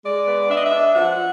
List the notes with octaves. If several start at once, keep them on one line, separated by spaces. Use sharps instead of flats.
G#3 D5
B3
D4 E5
D#5
E5
D4
F3 F#5